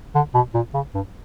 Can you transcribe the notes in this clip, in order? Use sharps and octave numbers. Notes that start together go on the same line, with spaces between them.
D3
B2
A#2
C#3
G2